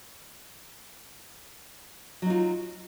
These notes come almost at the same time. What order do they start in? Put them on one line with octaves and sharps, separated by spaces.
F#3 D#4 F4